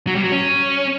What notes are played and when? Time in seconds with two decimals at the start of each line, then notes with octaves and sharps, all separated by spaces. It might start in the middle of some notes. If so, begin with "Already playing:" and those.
0.07 F#3
0.15 G3
0.23 F#3
0.32 C#4